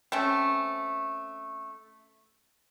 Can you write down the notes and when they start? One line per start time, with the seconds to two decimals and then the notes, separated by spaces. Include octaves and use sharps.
0.12 A3 C4 C#4